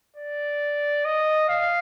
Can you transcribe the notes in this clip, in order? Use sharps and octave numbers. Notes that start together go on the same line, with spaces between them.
D5
D#5
F5